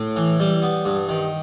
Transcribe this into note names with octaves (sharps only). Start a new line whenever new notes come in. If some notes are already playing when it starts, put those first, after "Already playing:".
Already playing: A2
E3
G3
B3
G2
D#3